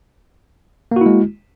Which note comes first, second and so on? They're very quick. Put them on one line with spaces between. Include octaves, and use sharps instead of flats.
A#3 F#4 E4 G#3